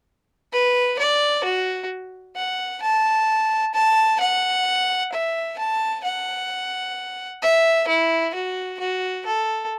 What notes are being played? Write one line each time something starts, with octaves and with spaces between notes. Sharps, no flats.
B4
D5
F#4
F#5
A5
A5
F#5
E5
A5
F#5
E5
E4
F#4
F#4
A4